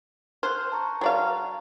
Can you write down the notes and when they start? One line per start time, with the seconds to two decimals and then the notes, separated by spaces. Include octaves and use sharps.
0.43 C5 F6 F#6
0.72 A5 A#5 C#6
1.01 F#3 D5 F5